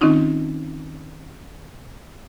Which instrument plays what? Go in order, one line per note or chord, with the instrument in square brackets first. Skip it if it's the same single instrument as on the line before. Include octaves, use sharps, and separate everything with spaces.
[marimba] D#3 C4 C#4 D#4 F4